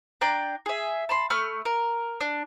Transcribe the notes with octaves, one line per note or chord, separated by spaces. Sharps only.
D4 D5 G5 A#5
G#4 E5
A5 B5 C6
A3 B5 F6
A#4
D4